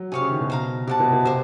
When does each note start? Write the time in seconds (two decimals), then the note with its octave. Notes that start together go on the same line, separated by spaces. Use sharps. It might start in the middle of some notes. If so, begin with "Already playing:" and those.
Already playing: F#3
0.12 C3 G#4 C#5 F5
0.21 C#3
0.31 D#3
0.40 B2
0.50 C5 F5 A#5
0.87 C3 D5 F#5 A5
1.00 B2
1.12 B2
1.25 C3 C5 E5